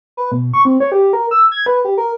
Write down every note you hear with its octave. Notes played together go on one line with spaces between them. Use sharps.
B4
B2
C#6
C4
C#5
G4
A#4
E6
G#6
B4
G4
A#4